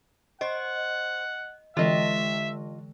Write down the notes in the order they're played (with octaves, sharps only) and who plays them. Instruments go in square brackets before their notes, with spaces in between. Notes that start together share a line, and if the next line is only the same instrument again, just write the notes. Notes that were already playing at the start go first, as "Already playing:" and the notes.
[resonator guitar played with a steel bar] C5 [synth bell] D#5 [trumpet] F#5
[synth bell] D3 E3 G#3 [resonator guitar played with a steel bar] F4 D#5 [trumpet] E5